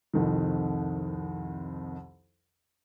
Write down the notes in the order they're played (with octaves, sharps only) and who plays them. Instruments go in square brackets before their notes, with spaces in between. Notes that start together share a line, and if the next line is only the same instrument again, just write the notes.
[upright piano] C2 F2 D#3